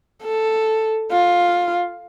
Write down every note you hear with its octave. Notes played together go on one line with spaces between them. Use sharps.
A4
F4